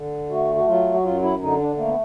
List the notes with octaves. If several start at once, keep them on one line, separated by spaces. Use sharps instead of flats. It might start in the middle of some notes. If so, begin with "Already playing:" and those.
Already playing: D3
A3 F#4
F#4
F#3 F4
F#4
F#2 F4
E4
D3 D#4
D4
A3 A#3
B3